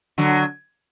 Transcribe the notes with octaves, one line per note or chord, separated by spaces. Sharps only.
D3 F#3